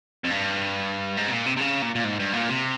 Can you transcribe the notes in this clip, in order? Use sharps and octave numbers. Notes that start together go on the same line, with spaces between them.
F2
G2
G#2
C3
A#2
C3
C3
C#3
A#2
A#2
G#2
G2
A#2
C3